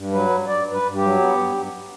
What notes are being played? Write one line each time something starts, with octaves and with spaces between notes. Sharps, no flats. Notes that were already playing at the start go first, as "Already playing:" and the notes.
Already playing: G2
F#3 B4
G2
G2 D5
G2
B4
G2
G4
F#3
B3
G2
G2